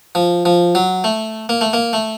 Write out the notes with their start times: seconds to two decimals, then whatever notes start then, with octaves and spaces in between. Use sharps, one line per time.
0.15 F3
0.45 F3
0.75 F#3
1.04 A3
1.49 A#3
1.61 A3
1.73 A#3
1.93 A3